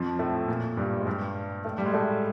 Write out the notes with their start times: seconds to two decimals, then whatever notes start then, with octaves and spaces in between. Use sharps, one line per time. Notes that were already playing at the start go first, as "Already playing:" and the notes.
Already playing: F2 F3
0.19 A2 A3
0.48 A#2 A#3
0.77 G2 G3
1.00 G#3
1.07 G2 G3
1.65 A2 A3
1.78 G3
1.86 G#3
1.93 A2 A3